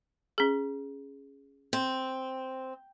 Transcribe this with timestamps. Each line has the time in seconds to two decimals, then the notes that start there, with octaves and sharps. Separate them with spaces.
0.38 C#4 G#4
1.73 C4